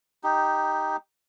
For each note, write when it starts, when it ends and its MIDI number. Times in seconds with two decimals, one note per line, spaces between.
0.24 0.96 63
0.24 0.96 67